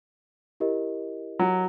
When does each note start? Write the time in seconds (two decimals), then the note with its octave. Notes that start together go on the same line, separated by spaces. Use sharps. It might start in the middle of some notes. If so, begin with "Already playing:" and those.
0.60 E4 G4 A#4 D#5
1.39 F#3